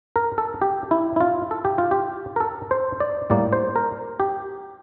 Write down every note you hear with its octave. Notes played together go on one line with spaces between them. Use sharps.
A#4
A4
G4
E4
E4
F4
A4
G4
F4
G4
A#4
A4
C5
D5
A2 G3 A#3 D5
C5
A#4
G4